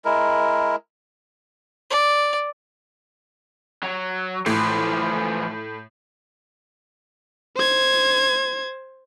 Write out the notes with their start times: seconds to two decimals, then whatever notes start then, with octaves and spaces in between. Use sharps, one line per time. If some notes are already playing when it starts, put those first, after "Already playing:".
0.05 G#3 E4 A#4
1.90 D5
3.83 F#3
4.46 A2 E3 F3
7.56 C5 G#6